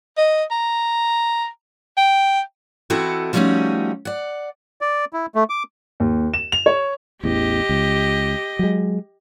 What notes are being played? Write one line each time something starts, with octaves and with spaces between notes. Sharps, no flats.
D#5
A#5
G5
E3 C4 E4 F#4 A4 D#5
F3 G3 A3 C#4 D#4 F#4
D5 F#5
D5
E4
A3
D6
D#2
E7
F7
C#5
A1 E2 G4 D#5
C#2
F#3 G#3